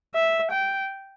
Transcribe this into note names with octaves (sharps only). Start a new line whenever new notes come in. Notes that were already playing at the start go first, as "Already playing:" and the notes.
E5
G5